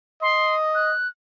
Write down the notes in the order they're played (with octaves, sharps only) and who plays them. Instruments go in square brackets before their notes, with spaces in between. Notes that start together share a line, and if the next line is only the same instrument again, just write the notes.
[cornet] D#5 [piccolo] C6
[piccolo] F#6